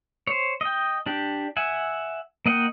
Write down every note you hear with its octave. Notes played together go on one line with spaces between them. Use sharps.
C5 C#5
D#5 G5
D4 G4
E5 F#5 G#5
A#3 D#5 F#5 G5